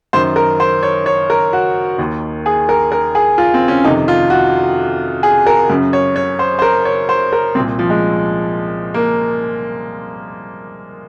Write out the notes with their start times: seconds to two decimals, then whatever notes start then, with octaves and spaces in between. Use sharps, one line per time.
0.13 F#2 D#3 C5
0.36 A#4
0.60 C5
0.83 C#5
1.06 C#5
1.30 A#4
1.53 F#4
1.98 D#2 D#3
2.46 G#4
2.69 A#4
2.92 A#4
3.15 G#4
3.38 F4
3.54 C4
3.68 C#4
3.84 F2 C3 D#3 D#4
4.08 F4
4.30 F#4
5.23 G#4
5.47 A#4
5.70 F#2 C#3
5.93 C#5
6.16 C#5
6.39 C5
6.59 C5
6.62 A#4
6.85 C#5
7.09 C5
7.33 A#4
7.55 C2 C4
7.60 A#2
7.79 F3
7.90 G#3
8.94 A#3